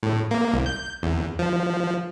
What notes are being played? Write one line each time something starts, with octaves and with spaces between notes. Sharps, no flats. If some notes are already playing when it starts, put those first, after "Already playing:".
A2
A#3
C2
G6
E2
F3